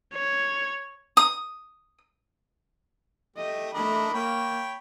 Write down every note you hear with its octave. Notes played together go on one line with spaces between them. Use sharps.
C#5
D#6
A3 G4 D#5
A3 D4 A#4 D#5 B5
A#3 C#5 G5 B5